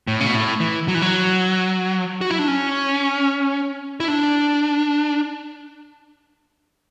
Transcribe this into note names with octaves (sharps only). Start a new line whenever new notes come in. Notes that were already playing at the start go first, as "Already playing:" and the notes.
A2
C#3
B2
A2
E3
F#3
E3
F#3
F#4
E4
D4
C#4
E4
D4